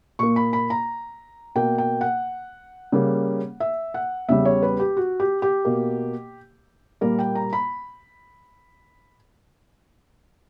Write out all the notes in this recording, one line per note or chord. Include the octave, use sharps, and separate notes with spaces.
A#2 A#3 C#6
B5
B5
A#5
B2 A#3 G5
G5
F#5
C#3 G3 A#3
E5
F#5
E2 C#3 G3 E5
C#5
B4
G4
F#4
G4
G4
B2 A#3
A#2 G3 A#3 A#4
G5
A#5
B5